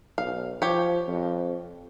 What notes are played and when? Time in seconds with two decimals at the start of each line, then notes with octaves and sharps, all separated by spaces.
0.18 B1 F5
0.62 F3 G4 C#5
1.08 F2